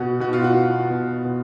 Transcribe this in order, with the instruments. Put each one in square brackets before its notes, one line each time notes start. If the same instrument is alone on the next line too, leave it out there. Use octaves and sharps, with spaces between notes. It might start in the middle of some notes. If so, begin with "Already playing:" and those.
Already playing: [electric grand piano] B2 [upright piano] F#4
[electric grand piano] B2 [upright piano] F#4
[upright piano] F4
F#4
[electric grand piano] B3
B2
B2